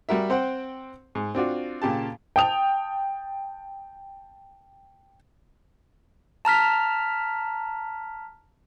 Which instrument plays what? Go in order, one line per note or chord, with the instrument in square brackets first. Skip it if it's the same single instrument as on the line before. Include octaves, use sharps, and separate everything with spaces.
[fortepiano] G3 F#4 A#4 E5
C4 C5 F#5 G5
G#2
C4 D4 F4 F#4
A#2 C#3 G4 A5
[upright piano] G5 A5 D#6 F7
[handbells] A5 A#5 F6 B6